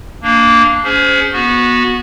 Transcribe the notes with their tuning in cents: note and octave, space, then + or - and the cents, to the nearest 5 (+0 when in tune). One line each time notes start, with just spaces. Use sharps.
A#3 -10 D4 +0
C#4 +30 G#4 +0 C5 -15
B3 -25 F#4 -15